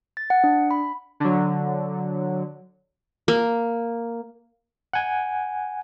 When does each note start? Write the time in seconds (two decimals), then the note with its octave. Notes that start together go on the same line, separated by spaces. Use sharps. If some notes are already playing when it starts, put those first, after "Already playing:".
0.17 A6
0.30 F#5
0.44 D4
0.71 B5
1.20 D3 F#3
3.28 A#3
4.93 F#5 G#5